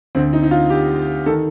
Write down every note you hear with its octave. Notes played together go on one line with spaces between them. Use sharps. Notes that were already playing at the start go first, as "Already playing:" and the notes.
D2 D3 C4
D#4
D#4
F4
G4
D#3 A4